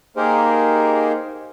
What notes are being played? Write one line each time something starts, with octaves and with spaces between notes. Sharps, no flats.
A#3 D#4 G4 G#4 A#4 C5